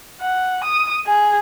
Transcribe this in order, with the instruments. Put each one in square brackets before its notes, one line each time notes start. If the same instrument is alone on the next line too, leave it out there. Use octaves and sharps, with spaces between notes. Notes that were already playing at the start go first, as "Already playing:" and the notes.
[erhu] F#5
D#6
G#4